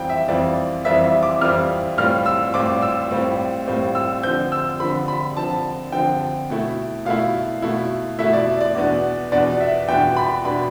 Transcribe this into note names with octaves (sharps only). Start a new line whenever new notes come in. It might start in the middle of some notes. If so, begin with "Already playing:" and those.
Already playing: F2 E3 G3 C4 F4 G5
E5
F2 E3 G3 C4 F4 D5
F2 E3 G3 C4 F4 E5
E5
D6
F2 E3 G3 C4 F4 F6
A2 G3 C4 F4 F6
E6
A2 G3 C4 F4 D6
E6
A2 G3 C4 F4
A2 G3 C4 F4
E6
D3 F3 C4 G6
E6
D3 F3 C4 B5
B5
D3 F3 C4 A5
D3 F3 C4 G5
B2 A3 E4
B2 A3 E4 F5
B2 A3 E4
B2 A3 E4 E5
D5
D5
E2 B2 B3 D4
E2 B2 B3 D4 D5
E5
E2 B2 B3 D4 G5
B5
B2 B3 D4 B5